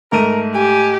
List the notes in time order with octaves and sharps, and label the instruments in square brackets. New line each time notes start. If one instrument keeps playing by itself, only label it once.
[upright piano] G#2 A3 D#7 [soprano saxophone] A#4
[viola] G4 [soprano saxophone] G#5